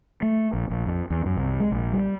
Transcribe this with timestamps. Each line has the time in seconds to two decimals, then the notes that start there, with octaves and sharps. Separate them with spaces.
0.22 A3
0.53 A#1
0.70 A#1
0.86 F2
1.10 E2
1.26 F#2
1.37 C2
1.60 G#3
1.72 A#1
1.93 G3